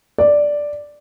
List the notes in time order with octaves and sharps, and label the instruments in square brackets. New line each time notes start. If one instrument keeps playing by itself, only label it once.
[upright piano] D5